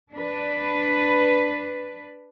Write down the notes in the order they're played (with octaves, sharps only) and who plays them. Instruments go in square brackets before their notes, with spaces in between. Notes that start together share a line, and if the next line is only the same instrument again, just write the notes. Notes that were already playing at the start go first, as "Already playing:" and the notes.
[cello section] D4 B4